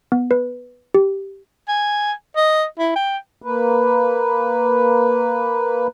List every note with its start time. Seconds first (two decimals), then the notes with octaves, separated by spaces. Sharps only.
0.12 B3
0.31 B4
0.94 G4
1.68 G#5
2.36 D#5
2.79 E4
2.96 G5
3.42 A#3 B4